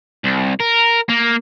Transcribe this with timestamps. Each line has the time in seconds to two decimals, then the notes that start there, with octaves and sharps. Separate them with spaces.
0.24 C2
0.60 A#4
1.09 A#3